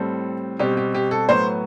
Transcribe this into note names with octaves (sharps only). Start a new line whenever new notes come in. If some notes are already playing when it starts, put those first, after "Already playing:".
Already playing: A2 G3 C4 A4
B2 G3 C4 G4
G4
G4
A4
A2 F#3 B3 C5